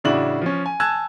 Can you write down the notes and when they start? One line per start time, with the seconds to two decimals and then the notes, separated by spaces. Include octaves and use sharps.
0.04 A1 C#3 D4 E4 F#4 F#7
0.42 F3 C#4
0.66 G#5
0.80 G#5 A5 E6 F#6 G#6